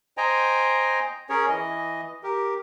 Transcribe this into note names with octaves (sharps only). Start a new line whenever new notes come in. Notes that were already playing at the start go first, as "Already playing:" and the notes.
C5 D#5 G5 G#5 A#5
C#4 G#4 A#4 C#5
E3 D#5
G4 A#4